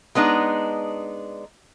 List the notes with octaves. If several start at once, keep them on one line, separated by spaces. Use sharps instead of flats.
G#3 B3 D4 D#4